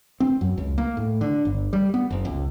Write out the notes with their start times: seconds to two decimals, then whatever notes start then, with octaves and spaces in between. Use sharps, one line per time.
0.20 C4
0.41 F#2
0.57 C#2
0.78 A#3
0.97 A2
1.21 D3
1.45 G1
1.73 G3
1.94 B3
2.10 F#1
2.25 C#2